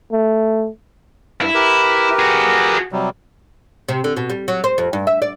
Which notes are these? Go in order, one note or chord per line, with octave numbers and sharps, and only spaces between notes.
A3
G2 E4
G4 A#4 B4
F#4 G#4
C3 F#3 G3
C3
D3
B2
G3
F#3
C5
F2
G2
E5
D5